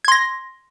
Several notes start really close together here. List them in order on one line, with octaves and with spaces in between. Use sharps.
G#6 C6 A#6